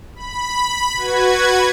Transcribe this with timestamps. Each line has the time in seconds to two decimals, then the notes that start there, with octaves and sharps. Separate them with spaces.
0.16 B5
0.97 F#4 B4 G#6